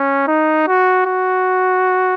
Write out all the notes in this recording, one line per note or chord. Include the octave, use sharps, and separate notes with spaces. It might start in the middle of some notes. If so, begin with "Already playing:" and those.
Already playing: C#4
D#4
F#4
F#4